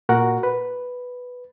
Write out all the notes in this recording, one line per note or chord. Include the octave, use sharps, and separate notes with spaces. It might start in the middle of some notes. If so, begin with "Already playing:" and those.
A#2 F#4 A#4 F#5
B4